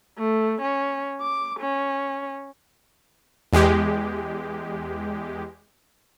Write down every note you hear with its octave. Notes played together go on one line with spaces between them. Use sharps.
A3
C#4
D6
C#4
E2 G#3 G4